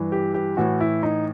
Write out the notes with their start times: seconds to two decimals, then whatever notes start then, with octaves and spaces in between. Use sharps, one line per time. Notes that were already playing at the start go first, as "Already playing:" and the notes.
Already playing: G2 E3
0.12 G4
0.34 G4
0.57 A2 E3 F#4
0.80 E4
1.03 D#4